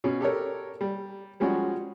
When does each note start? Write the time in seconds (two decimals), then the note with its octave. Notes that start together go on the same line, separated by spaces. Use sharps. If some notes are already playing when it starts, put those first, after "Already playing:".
0.04 B2 C#4
0.21 G4 A4 A#4 C#5
0.81 G3
1.40 F3 G3 G#3 C#4 F#4